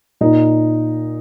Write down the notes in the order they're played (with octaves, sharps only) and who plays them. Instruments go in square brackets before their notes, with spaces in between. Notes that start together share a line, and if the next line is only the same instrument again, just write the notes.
[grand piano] A#2 D#4